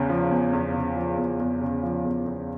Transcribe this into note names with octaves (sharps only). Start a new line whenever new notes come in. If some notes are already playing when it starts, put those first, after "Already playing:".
Already playing: E2 C#3
F3
E2
E2
C#3
F3
E2
E2
C#3
F3
E2
E2